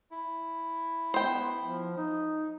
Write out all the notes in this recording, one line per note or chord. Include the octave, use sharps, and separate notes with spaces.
E4
B3 C5 G5
F3
D#4